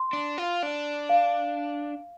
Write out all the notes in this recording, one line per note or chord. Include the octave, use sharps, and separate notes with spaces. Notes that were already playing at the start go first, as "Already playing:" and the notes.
Already playing: C6
D4
F4
D4
F5